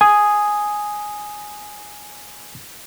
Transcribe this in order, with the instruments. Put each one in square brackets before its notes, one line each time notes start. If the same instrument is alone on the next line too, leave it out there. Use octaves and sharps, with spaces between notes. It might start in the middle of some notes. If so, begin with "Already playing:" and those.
[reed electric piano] G#5 D#6